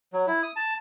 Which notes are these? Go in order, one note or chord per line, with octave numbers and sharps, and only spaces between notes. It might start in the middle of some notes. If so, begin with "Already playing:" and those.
F#3
E4
D#6
A5